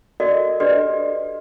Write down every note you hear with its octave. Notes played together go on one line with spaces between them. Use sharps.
F#4 A4 A#4 D5 D#5
D4 G4 A4 B4 D5 D#5